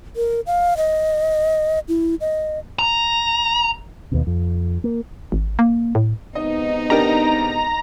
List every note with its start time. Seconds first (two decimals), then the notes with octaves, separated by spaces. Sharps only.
0.16 A#4
0.46 F5
0.77 D#5
1.88 E4
2.21 D#5
2.79 A#5
4.12 D#2 B2
4.27 F2
4.84 A#3
5.32 G#1
5.59 A#3
5.95 A2
6.35 C3 G#3 B3 D#4 D#5
6.90 D4 G4 A#4 A#5